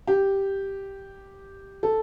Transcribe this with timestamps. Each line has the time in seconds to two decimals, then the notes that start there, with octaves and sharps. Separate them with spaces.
0.07 G4
1.83 A4